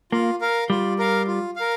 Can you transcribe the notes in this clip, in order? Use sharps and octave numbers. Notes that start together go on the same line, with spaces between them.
A#3 F4
A#4 F5
G3 F4
A#4 F5
F4
A#4 F5